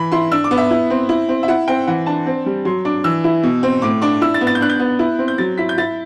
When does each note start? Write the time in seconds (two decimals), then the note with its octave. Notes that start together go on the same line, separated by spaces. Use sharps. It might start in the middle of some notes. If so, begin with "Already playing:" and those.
Already playing: E3 B5
0.12 E4 C6
0.32 D4 E6
0.44 D6
0.51 B3
0.58 E5
0.71 E4
0.90 C4
1.09 E4
1.29 C4
1.43 E5
1.48 E4 F#5
1.68 C4 G5
1.87 E3 F#5
2.06 D4 A5
2.26 C4
2.46 G3
2.65 F#3 C6
2.85 D4 D6
3.04 E3 E6
3.24 E4
3.43 B2
3.63 C4
3.82 A2 D6
4.02 D4 D6
4.21 E4 E6
4.34 A6
4.41 B3
4.47 A6
4.55 G6
4.61 D4 F#6
4.70 G6
4.79 B3
4.99 E4
5.19 C4
5.28 G6
5.38 F#3 A6
5.58 E4 B6
5.69 G6
5.78 E4 A6